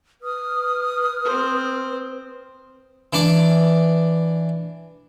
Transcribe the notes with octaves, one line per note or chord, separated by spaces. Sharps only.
B4 D#6 F6
C4 C5
E3 D4 D6